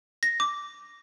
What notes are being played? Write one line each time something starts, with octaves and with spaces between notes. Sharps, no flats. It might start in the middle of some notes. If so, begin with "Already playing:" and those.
A#6
D6